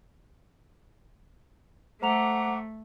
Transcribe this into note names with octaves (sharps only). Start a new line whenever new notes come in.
A3 C5 F#5 A#5 D6 F7